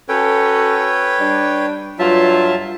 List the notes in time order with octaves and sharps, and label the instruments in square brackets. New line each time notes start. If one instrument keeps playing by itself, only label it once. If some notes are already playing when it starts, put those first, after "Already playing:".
[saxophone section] C#4 F#4 A4 [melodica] B4 C#5 G5
[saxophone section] G3 D4
[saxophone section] G2 F4 [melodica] F#3 E5 A5